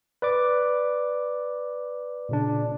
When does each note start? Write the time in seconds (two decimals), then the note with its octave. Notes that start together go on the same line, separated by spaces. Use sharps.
0.22 B4 D5 D6
2.29 A#2 C#3 D4